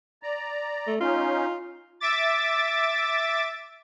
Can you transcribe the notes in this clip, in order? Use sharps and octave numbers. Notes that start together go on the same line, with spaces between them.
D5 A#5
A3
C#4 D#4 F4
E5 D6 A6